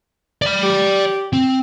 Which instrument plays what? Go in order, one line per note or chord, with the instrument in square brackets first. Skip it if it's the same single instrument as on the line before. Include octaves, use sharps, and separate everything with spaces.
[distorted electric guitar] D5 B5
[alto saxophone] G4
[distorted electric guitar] C4